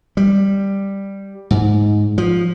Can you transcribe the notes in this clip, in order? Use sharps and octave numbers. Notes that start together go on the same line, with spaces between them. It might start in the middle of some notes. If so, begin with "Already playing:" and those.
G3
G#2
F3